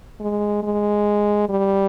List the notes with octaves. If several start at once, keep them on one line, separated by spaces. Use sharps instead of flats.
G#3
G#3
G3